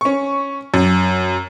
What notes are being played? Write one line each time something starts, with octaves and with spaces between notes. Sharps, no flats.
C#4 C#6
F#2